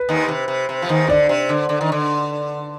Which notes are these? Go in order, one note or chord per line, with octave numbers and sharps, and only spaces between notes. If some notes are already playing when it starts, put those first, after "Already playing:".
Already playing: B4
D#2 D#3
C3
C3
C3
F3
D#2 D#3
D3 D5
C3
D3
D3
D#3
D3